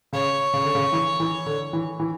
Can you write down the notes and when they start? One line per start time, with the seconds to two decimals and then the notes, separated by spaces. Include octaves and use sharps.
0.13 C#3 C#5
0.53 C#3
0.64 D3
0.75 C#3
0.92 E3
1.20 E3
1.46 D3
1.73 E3
2.00 E3